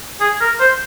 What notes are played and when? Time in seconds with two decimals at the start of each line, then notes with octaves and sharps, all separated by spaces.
0.21 G#4
0.40 A#4
0.60 C5